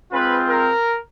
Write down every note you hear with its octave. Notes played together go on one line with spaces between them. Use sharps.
G#3 C4 F4 B4
A#4